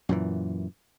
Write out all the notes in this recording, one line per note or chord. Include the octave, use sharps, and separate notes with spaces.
F#2 A#2 E3